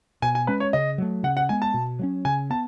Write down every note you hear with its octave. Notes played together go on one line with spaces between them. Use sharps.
B2 G#5
G#5
G#3 C#4 B4
C#5
C#3 D#5
F#3 A3
C#3 F#5
F#5
G#3 B3 G#5
A5
B2
F#3 A3 C#4
C#3 G#5
B3 A5